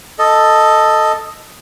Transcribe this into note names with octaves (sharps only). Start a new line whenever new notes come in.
A4 D#5